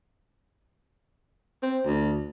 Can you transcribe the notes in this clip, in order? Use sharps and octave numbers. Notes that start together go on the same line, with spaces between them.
C4
D2